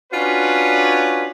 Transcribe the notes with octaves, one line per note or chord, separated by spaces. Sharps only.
C#4 D4 F4 F#4 B4 C#5